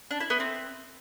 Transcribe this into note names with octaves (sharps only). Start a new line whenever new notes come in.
D4
E4
B3
C4